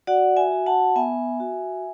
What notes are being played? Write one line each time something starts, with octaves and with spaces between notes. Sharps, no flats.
F#4 D5 F#5
E5 G#5
F#4
F#5 A5
B3 E5 G#5
F#4